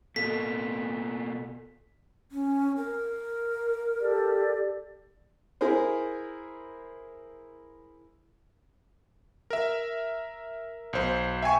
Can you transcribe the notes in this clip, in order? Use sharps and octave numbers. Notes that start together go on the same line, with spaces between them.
B2 A#3 A4 B6
C#4
A#4
G4 A4 D5
E4 G#4 A#4 C5
A#4 E5
B1 C5
E5 G5 G#5 C#6